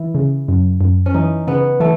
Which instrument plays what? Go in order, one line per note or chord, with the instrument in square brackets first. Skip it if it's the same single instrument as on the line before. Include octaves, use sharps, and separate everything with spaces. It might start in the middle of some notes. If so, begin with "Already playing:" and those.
Already playing: [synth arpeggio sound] E3 [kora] E4
[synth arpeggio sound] C#3
F#2
F#2
[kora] C#4
[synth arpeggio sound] E3 [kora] D#4
[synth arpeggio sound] C#3 [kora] B3
[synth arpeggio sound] E3 [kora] A3